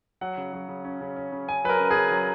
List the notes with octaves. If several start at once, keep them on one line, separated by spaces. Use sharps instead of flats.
F#3 F#5
C#3
F#3
C#3
C#4
C#3
C#4
C#3
C#4 G#5
F#3 A#4 B4
C#3
G#4
C#3
F#3